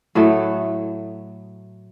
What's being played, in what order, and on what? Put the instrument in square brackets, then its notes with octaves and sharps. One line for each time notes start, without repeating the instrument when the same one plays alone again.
[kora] A2 F#3 A3